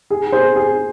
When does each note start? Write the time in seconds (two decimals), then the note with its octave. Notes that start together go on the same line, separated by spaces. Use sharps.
0.10 G#4
0.32 G#4 C5
0.56 G#4